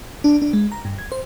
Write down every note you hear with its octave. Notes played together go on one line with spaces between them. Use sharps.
D4
D4
G#3
A#5
G2
G#6
C5